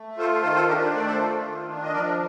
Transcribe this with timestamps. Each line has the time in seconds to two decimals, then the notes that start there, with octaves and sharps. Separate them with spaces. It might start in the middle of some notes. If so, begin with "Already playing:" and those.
Already playing: A3
0.18 F4 A4 C5
0.43 D#3 A4 C5
0.55 A4 C5
0.68 D4 G4 A#4
0.80 C5
0.93 A3 D5
1.06 A4 C5
1.18 F4
1.43 D#3
1.68 D4
1.83 D#5
1.93 F3 A#4 D5